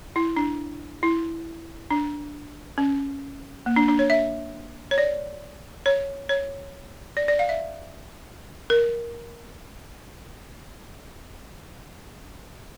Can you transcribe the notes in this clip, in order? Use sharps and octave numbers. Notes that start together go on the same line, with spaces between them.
E4
D4
E4
D4
C#4
A#3
D4
D4
C#5
E5
C#5
D5
C#5
C#5
D5
D5
F5
E5
A#4